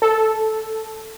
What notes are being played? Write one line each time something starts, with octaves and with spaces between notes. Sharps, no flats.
A4